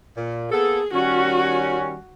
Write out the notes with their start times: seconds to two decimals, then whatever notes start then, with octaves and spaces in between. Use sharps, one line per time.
0.17 A#2
0.52 A#3 B3 G#4 A4
0.93 D#3 G3 C#4 F#4